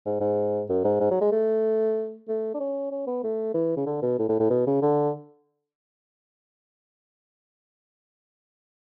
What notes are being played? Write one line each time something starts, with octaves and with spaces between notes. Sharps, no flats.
G#2
G#2
F#2
G#2
G#2
F#3
G#3
A3
A3
D4
C#4
C#4
B3
A3
E3
C#3
D3
B2
A2
A2
A2
B2
C#3
D3